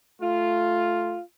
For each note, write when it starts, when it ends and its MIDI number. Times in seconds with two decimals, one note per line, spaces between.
0.22 1.18 57
0.22 1.18 65